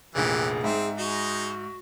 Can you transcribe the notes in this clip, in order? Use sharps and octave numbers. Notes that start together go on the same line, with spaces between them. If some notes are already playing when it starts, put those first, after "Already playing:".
F1 A#1 E3 G4 G#4
G#2 C4 E5
G#3 D#4 F#4